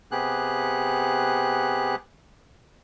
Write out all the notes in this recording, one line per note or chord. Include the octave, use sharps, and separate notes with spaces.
C3 B3 G4 G#4 F#6